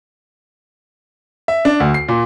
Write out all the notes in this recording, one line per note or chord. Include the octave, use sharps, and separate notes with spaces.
E5
D4
D2
C7
A#2